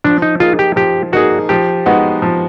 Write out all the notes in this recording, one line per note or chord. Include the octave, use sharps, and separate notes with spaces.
F3 D4
D#4
A#3 D#4 F4 G#4
G4
F3 G4
A#3 D#4 F#4 G#4
F3 G4
G#3 B3 D#4 F#4
F3